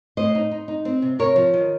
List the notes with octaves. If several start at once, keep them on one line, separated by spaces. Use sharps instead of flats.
A2 C5 D#5
D#4
D#4
D#4
C4
C3
C3 A#4 C#5
F3
D#3